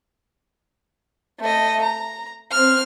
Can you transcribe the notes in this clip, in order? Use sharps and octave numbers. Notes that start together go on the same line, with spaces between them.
A3 D#5
A#5
C4 F6